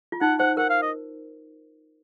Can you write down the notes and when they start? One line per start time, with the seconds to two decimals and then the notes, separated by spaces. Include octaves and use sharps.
0.12 F4
0.21 D#4 F#5
0.39 C5 F#5
0.57 A#4 F#5
0.69 F5
0.82 D#5